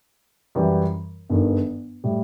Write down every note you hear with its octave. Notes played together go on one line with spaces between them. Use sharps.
F#2 E3 G3
G1 G2 D#3
A2 G3